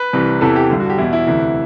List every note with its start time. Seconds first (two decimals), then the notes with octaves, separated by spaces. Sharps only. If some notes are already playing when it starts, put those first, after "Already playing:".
Already playing: B4
0.13 C2 C3 E3
0.41 E2 C3 E3 A4
0.56 G4
0.70 G2 D3
0.80 F#4
0.90 G4
0.98 E2 B2 E4
1.13 E4
1.27 D2 C3 E3